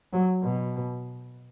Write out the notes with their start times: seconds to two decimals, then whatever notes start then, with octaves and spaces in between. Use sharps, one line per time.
0.13 F#3
0.43 B2